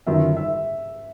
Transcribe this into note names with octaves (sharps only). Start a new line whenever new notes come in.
G1 F#2 D#3 E5
E5